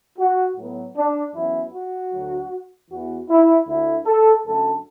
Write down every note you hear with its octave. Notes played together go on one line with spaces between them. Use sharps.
F#4
A2 F#3 B3
D4
F#2 E3 B3 E4
F#4
D2 D3 F#3
E2 E3 B3 F#4
E4
D2 D3 A3 E4
A4
F#2 D3 A3 A4